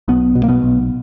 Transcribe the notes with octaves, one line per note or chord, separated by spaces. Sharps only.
B1 B2 B3
B2
A#3
B2 B3
B1